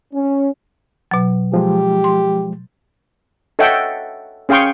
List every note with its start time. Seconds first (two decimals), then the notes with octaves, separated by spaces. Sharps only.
0.14 C#4
1.11 B2 F#3
1.54 F3 G#3 G4
2.04 C6
3.59 A4 C#5 D#5 E5 F#5 G5
4.49 C#4 G#4 F5 G5 C6 C#6